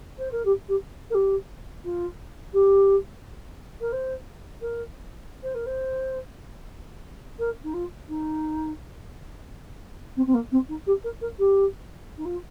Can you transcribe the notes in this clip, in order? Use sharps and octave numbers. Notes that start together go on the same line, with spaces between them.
C5
A#4
G4
G4
A#4
G4
F4
G4
A#4
C5
A#4
C5
A#4
C5
A#4
D#4
F4
D#4
C4
C4
A#3
C4
D#4
G4
A#4
A#4
G4
D#4
F4